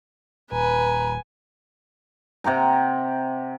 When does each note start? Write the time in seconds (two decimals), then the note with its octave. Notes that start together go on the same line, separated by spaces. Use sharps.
0.52 D#1 B4 G#5 A#5
2.44 C3 G4 F#5 A#5